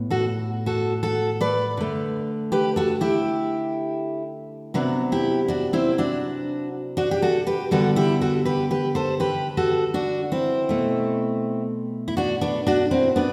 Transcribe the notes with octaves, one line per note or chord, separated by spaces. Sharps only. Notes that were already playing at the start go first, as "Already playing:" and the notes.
Already playing: A2 B3
F#4 A4
F#4 A4
F#4 A4
B4 D5
D3 A3
G4 B4
F#4 A4
E4 G4
C3 F#3 B3 D4 F#4
E4 G4
D4 F#4
C4 E4
D4 F#4
D4 F#4
G4
F#4 A4
G4 B4
D3 G3 B3 F#4 A4
E4 G4
F#4 A4
G4 B4
G4 B4
A4 C5
G4 B4
F#4 A4
D4 F#4
C4 E4
B2 A3
E4
D4 F#4
B3 D4
D4 F#4
C4 E4
B3 D4